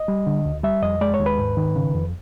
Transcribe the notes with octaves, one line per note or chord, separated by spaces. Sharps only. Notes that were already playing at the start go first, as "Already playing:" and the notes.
Already playing: D#5
G3
D3
D2
G3 E5
F2 D#5
G#3 D5
C#5
D#2
B4
G#2
D#3
C#3
F2